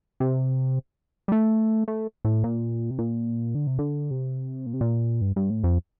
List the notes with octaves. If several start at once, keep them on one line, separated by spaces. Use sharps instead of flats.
C3
G3
A3
A3
A2
A#2
C3
A#2
D3
C3
D3
C3
A#2
C3
A#2
G2
G2
A2
F2